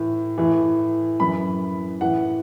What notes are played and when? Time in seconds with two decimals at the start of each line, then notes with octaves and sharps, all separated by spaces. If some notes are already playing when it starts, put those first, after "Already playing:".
Already playing: A2 E3
0.38 A2 E3
1.20 F#2 E3 B5
2.01 A2 E3 F#5